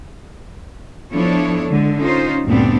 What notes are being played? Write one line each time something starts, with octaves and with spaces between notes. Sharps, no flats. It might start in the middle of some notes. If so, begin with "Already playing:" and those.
F3 B3 D4 E4 A4 C#5
D3 G#3
C#4 D#4 F4 C5
D2 G2 A#2 B3 C4 D4